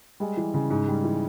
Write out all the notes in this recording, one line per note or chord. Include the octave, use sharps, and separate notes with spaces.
G3 G#3
E3
C#3
G#2
G3
E3